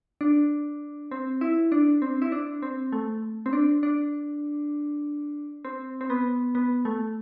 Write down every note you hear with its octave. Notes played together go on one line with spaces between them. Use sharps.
D4
C4
E4
D4
C4
E4
D4
C4
A3
C4
D4
D4
C4
C4
B3
B3
A3